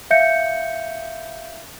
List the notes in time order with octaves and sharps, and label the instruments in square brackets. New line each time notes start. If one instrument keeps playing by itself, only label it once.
[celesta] E5 F5 G6 C#7